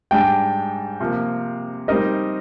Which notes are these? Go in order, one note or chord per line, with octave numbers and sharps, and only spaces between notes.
G#2 G3 D4 G5
C3 F3 A#3
G3 C4 D#4 G4 A#4 D#5